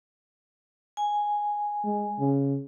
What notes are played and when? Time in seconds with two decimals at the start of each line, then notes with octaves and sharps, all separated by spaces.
0.97 G#5
1.84 G#3
2.19 C#3